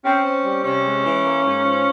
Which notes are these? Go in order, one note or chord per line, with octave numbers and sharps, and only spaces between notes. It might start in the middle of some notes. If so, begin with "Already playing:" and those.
C4 C#4
C4
G3
C3 C#4
G#3
E3
A#3
G#2
F3